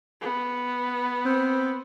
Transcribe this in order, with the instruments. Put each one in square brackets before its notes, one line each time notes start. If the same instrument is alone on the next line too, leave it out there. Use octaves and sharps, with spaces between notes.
[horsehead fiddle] B3
[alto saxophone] C4